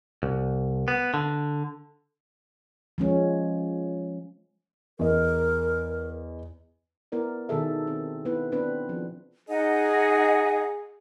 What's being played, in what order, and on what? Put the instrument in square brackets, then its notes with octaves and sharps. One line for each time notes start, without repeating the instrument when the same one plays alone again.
[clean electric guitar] C2
B3
D3
[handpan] F3 G#3 C#4
[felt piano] E2 D#5 [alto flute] A#4
[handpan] B3 E4 A#4 D5
B2 D#3 F#4 G#4 A4 E5
C4
B3 E4 B4
B3 C4 D4 B4
F3 C4 G#4
[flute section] D#4 D#5 F#5 [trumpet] G#4